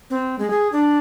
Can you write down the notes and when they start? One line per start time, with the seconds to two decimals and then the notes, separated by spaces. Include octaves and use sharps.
0.10 C4
0.39 G#3
0.50 G#4
0.72 D4